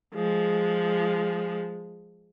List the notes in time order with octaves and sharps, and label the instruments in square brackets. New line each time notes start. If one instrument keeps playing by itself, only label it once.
[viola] F3 G#3